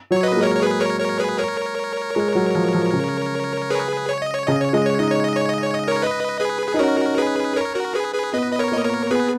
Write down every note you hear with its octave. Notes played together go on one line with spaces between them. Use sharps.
F#3 C#5
B4 D#5
A#3
G#3
A#4 C#5
C#5
G#4 B4
A#4 C#5
A#4 C#5
G#4 B4
A#4 C#5
G#3
F#3
F3
F3
C#3
G#4 B4
C#5
D#5
C#5
C#3 D#5
C#5
G#3 D#5
C#5
D#4 D#5
C#5
D#5
C#5
D#5
C#5
D#5
A#4 C#5
B4 D#5
G#4 B4
G#4
D#4
C#4 F#4 A#4
G#4 B4
A#4 C#5
F#4 A#4
G#4 B4
G#4 B4
B3 B4 D#5
D#5
A#4 C#5
A#3 D#5
A#4 C#5
B3 G#4 B4